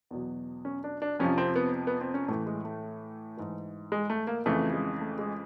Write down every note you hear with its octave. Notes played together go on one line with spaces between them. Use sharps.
E2 B2 F#3
C#4
D4
D4
F2 C3 F3 C#4
C4
B3
B3
C4
C#4
A2 E3 A3
G#3
A3
G#2 E3
G#3
A3
A#3
F2 C#3 E3 A3
G#3
A3
G#3